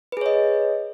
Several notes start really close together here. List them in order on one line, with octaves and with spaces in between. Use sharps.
B4 G#4 C#5 D#5